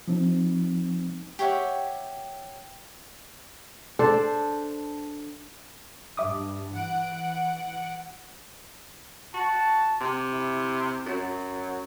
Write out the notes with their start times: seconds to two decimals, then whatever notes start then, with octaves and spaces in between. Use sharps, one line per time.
0.08 F3 C4 D#4
1.39 G4 C#5 E5 F#5
3.99 D4 A4 C5
6.17 G2 E5 D6 D#6
6.73 E3 F#5 D7
9.34 F#4 A5
10.01 C3
10.32 E4
11.06 F#2 F#3